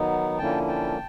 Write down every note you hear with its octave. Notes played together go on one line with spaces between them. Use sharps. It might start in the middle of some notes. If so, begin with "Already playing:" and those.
Already playing: D#3 F#3 B3 D#4
D3 F3 A#3 C#4 E4 G5 A5
G5 A5